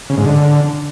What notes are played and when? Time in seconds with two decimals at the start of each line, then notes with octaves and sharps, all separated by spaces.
0.10 C#3
0.17 G#2
0.25 D3